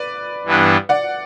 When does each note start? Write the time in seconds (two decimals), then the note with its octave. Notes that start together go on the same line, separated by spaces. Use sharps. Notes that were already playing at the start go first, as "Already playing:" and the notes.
Already playing: B4 D5
0.46 G2 E3 B3 D4
0.89 D5 F#5